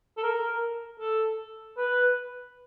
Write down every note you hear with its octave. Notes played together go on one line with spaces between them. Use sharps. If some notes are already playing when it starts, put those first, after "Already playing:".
A4
A#4
A4
B4